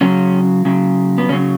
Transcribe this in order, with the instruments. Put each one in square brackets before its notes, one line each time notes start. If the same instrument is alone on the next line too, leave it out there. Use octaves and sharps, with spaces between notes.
[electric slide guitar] C#3 F#3 C#4
C#3 F#3
B3
C#3 F#3 C#4